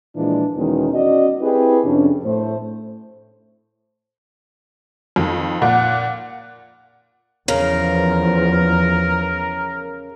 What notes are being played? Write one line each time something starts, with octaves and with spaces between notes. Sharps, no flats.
A#2 E3 F3 G#3 D4
E2 B2 D#3 G#3 C#4 D#4
C#4 F#4 D5 D#5
C4 E4 G4 G#4 B4
F2 C3 C#4 D4
A2 A3 C5
F2 D#3
A#2 F#5
E2 C#3 F3 A#4